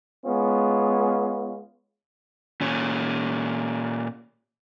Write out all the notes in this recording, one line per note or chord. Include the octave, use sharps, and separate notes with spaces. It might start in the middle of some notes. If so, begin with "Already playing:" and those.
G#3 B3 C#4 F4
A#2 C#4